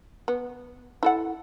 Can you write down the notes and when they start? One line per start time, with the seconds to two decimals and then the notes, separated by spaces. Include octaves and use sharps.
0.28 B3
1.03 E4 A4 F#5